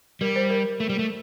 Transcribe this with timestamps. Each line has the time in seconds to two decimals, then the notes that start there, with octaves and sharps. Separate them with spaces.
0.21 G3 A#4
0.36 C5
0.50 A#4
0.80 A3
0.89 G3
0.99 A3